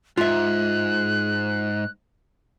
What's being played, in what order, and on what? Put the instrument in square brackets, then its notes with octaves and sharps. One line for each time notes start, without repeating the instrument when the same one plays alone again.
[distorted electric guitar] G#2 [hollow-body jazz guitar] F4 E5 [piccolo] F#6